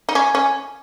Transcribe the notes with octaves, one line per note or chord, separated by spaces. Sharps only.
D#4
C#4
C#4